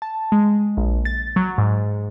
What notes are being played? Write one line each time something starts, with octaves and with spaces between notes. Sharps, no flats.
A5
G#3
A#1
A6
F#3
G#2